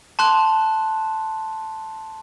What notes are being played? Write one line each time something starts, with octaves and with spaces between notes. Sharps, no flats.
A5 C6 F#6